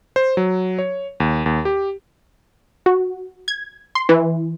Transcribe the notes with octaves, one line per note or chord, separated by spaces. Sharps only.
C5
F#3
C#5
D#2
D#2
G4
F#4
G#6
C6
E3